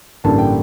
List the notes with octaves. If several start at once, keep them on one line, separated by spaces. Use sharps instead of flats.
A1 G2 D3 G3 A#3 A5
G5